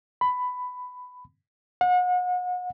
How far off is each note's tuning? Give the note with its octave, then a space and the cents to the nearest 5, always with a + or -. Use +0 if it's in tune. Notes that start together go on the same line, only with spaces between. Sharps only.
B5 +15
F#5 -35